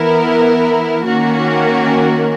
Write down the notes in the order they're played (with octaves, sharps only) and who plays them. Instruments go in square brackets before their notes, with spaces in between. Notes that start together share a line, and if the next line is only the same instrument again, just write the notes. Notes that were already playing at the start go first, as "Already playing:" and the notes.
Already playing: [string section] E3 B3 E4 A#4
D#3 A#3 C#4 F#4 A#4